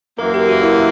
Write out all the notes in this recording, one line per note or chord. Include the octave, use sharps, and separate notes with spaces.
F#2 E3 A#3 A#4
G4
F#4
E4